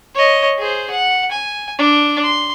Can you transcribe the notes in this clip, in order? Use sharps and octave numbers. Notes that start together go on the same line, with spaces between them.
C#5 D#5
G#4 C5
F#5
G#5
D4
C6